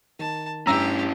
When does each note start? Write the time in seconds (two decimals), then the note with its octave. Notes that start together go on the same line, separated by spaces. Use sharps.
0.19 D#3 A5
0.67 G2 C#4 E4 G4 A#5 E6